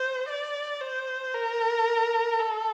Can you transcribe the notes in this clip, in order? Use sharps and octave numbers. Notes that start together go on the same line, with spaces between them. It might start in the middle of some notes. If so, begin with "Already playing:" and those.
Already playing: C5
D5
C5
A#4
A4